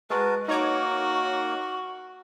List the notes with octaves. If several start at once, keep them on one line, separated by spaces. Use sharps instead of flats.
G#3 F#4 A#4 B4 A5
A#3 D#4 F#4 A#4 C#5 C#6 D6